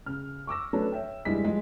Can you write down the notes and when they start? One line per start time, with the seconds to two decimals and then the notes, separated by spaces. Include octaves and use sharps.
0.06 C#3 F6
0.47 C#6 D6 E6 A#6
0.73 F#3 A3 C#4 D4 A4 B4
0.92 C#5 E5 G5
1.25 F1 G2 G3 G#3 E4 B6
1.45 F3 G3 G#3